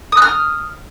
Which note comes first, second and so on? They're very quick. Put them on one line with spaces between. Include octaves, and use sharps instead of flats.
D#6 F#6 F6